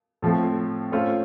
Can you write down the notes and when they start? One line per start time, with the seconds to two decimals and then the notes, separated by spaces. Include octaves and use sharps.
0.22 A2 F3 A3 C4
0.92 A3 C#4 F4 A4 C5